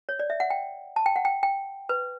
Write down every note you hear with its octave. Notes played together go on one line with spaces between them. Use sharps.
C#5
D5
E5
F#5
G5
A5
G5
F#5
G5
G5
B4